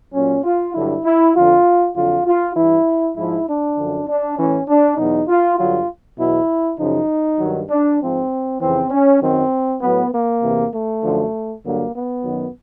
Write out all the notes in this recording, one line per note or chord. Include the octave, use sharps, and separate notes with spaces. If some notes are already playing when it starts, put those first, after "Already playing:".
A#2 F#3 C#4
F4
G2 D3 F#3 E4
E4
F2 D3 F3 F4
F2 D3 F#3 F4
F4
G2 E3 E4
G#2 F3 E4
D4
F#2 D3 F3
D4
A2 E3 C#4
D4
E2 B2 F#3 D#4
F4
G2 D3 F#3 F4
E2 B2 F#3 E4
F#2 C#3 F3 D#4
G2 D#3 F#3
D4
G#2 F3 C4
F2 C#3 E3 C4
C#4
F#2 D#3 F#3 C4
A2 F#3 B3
A#3
E2 C3 E3
A3
F#2 D3 F3
G2 D3 F#3 A#3
B3
F#2 D#3 F#3